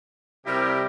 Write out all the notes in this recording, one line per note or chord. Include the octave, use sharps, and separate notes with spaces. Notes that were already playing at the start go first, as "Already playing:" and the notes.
C3 G3 E4 G4 A#4